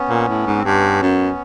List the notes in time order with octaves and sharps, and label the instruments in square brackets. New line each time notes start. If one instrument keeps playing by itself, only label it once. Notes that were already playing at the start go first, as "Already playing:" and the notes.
Already playing: [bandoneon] B3 C#4
[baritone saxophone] A#2
A2
G#2
[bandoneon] C4
[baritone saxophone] G2 [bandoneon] B3 C#4
[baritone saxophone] F#2